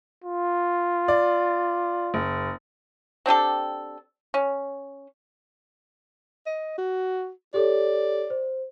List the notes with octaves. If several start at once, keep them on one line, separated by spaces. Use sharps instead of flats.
F4
D5
F#1
C4 D4 G4 A4
C#4
D#5
F#4
G4 A4 C#5 D5
C5